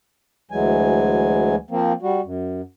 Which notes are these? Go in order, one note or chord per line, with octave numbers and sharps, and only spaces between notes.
D2 E3 F#3 G#3 G#5
F3 A#3 C4
G3 F#4
F#2